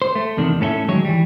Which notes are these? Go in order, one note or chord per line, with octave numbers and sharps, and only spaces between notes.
C5
A3
E2 C3 D#3 D4
A2 A3 C#4 D#4 A4 E5
D#3 F#3 G#3 C#5
E3 G3